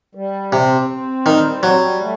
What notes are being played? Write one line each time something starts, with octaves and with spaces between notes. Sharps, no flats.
G3
C3 C4
C4
D#3 G3
F#3 G3
A3